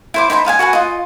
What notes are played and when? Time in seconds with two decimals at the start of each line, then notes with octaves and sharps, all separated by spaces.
0.14 E4 C5 D6
0.30 D#4 C5 G5 B5
0.45 D#5 F5 F#5 G#5
0.59 F#4 B4 F#5 G#5
0.73 F4 D#5